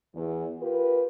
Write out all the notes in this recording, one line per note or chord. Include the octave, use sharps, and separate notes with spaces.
E2
F4 G4 A#4 B4